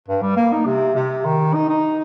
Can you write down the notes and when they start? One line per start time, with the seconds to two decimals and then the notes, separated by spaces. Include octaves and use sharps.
0.08 G2
0.22 G3
0.37 A#3
0.52 D#4
0.66 C3
0.95 C3
1.25 D#3
1.54 D#4
1.69 D#4